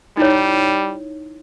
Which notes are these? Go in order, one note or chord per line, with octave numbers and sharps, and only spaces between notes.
G3 D#4 E4 C#5